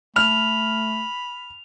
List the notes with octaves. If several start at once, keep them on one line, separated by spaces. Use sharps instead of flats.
A3 B5 F6 F7